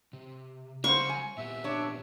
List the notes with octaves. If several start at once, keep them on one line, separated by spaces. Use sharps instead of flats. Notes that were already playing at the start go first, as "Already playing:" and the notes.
C3
C#3 F#3 G3 C5 F#5 C#6
G#5
A#2 B3 G4 E5
D4 C#5